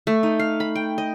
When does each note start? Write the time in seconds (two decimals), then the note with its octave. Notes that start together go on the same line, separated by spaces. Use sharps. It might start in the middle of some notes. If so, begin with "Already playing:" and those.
0.07 A3
0.23 D#4
0.39 F5
0.60 B5
0.75 G5
0.98 D#5